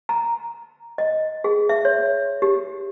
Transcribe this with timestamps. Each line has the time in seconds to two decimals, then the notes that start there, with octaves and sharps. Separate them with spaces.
0.09 A#5
0.98 D#5
1.44 G#4
1.69 E5
1.85 C#5
2.42 G4